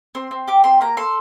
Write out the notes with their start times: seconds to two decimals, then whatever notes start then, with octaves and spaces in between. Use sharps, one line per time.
0.15 C4 C6
0.31 C4
0.48 G4 D6
0.64 C4 C6
0.81 A#3 A#5
0.97 A4 C6